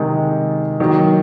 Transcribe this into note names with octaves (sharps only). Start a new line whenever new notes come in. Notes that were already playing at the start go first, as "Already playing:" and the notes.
Already playing: C3 D#3 G#3
D#3 F#3 A#3